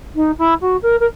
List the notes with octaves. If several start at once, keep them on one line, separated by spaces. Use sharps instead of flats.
D#4
E4
F#4
A#4
A#4